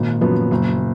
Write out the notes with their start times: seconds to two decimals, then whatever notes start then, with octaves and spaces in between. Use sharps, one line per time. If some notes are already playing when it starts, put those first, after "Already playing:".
Already playing: G#1 A#2
0.21 F#2 F3 B3
0.51 F#1